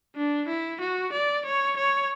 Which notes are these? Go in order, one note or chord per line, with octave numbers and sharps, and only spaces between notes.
D4
E4
F#4
D5
C#5
C#5